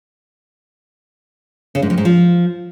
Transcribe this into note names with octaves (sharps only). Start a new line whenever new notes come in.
C#3
G#2
F2
G#2
F3